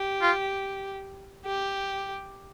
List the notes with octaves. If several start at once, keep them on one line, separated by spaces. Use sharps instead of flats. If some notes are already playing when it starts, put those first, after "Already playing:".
Already playing: G4
F4
G4